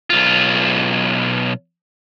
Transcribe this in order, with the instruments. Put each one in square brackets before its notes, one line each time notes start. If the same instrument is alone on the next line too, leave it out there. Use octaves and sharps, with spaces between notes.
[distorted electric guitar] B1 F4